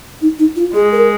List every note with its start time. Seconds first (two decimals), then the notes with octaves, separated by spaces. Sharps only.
0.21 D#4
0.38 D#4
0.56 F4
0.74 G#3 G#4
0.92 A#4